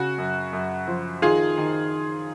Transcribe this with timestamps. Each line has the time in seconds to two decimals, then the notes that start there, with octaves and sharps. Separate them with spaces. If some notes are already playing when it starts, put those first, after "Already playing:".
Already playing: C#3 F#4
0.18 F#2
0.53 F#2
0.87 F3
1.22 D#3 F4 G#4
1.58 D#3